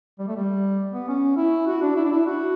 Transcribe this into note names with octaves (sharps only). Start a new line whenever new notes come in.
G3
A3
G3
B3
C#4
E4
F#4
D4
E4
D4
E4
F#4